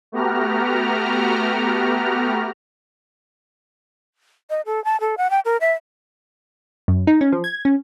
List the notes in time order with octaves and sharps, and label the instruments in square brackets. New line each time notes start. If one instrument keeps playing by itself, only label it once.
[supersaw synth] A3 B3 F#4 G4 A#5 F6
[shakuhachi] D#5
A4
A5
A4
F#5
G5
A#4
E5
[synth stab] F#2
D#4
C#4
F3
G#6
C#4